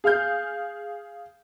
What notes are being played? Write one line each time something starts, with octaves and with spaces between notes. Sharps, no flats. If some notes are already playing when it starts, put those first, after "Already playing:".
G#4 F5 F6 G6